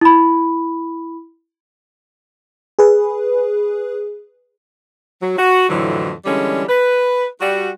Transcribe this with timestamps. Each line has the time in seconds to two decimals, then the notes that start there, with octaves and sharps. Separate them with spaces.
0.01 E4 B5
2.79 G#4 B4
5.21 F#3
5.38 F#4
5.69 F2 A2 D3 E3 F#3
6.25 D3 E3 G3 G#3 C#4
6.69 B4
7.40 G3 F#4